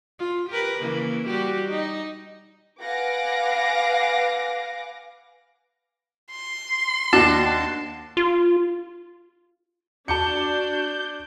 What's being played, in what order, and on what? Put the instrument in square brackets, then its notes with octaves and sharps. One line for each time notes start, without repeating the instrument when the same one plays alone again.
[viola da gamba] F4
G4 A#4 B4
C#3 E3 A#3
G3 F#4 G4
D#4
[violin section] B4 F5 F#5 G#5 D6 A#6
[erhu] C6
[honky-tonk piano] D#2 F#4 [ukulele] D4 [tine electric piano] A5
[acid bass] F4
[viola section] D4 [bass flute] F#4 [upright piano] A5 D6 C#7 [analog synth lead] G6